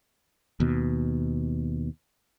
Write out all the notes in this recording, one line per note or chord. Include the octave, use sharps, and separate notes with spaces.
D#2 B2